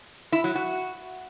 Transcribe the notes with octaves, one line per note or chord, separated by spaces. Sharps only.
E4
F#3
F#4